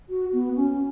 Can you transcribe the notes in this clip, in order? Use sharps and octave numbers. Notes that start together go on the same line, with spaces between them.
F#4
B3
C#4